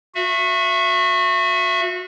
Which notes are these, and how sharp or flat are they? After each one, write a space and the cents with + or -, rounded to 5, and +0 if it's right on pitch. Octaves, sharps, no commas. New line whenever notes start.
F#4 -25 E5 +20